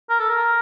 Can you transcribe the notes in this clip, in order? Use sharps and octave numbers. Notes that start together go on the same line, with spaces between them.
A#4
A4
A#4